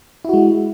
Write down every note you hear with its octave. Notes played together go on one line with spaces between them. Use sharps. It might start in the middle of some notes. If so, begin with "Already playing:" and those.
G#3 E4 F#4